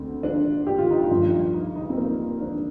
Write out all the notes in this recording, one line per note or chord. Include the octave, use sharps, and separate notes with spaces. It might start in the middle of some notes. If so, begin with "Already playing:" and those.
Already playing: D2 D3 C4
D4
G4
F4
D#4
F4
G2 F3
D#4
D#4
C4
A#3
D4